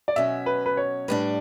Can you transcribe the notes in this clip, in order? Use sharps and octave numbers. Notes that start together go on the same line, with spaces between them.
D5
B2 F#3 C#4 E5
B4
B4
C#5
A2 G3 D4 B4